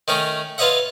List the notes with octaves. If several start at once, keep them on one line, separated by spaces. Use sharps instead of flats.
D#3 A3 C#4 D#4
F4 B4 C#5 D#5 E5 F#5